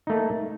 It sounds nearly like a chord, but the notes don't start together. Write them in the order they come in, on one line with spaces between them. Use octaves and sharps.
D#4 A3 A#3